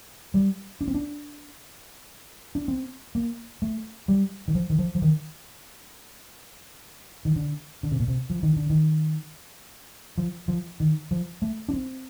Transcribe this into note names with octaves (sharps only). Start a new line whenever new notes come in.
G3
D4
C4
D4
D4
C4
A#3
A3
G3
D#3
F3
D#3
F3
F3
D#3
D#3
D3
D3
C3
A#2
C3
F3
D#3
D3
D#3
F3
F3
D#3
F3
A3
D4
C4